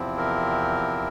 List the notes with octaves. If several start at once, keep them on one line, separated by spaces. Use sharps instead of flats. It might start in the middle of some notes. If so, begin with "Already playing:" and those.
Already playing: E2 C3 F3 C4 E4
A#4